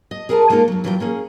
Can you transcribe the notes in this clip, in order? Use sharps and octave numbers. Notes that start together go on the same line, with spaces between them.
D#5
G#4 A#4 B4 F#5 A5 A#5
G#3 A#3 D#4 F4 A4 A#4
F#2 F#3
A#2 E3 F#3 F4 A#4 G5
A#3 C#4 G#4